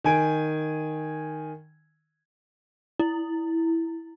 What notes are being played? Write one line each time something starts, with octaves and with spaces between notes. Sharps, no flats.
D#3 G#5 D7
E4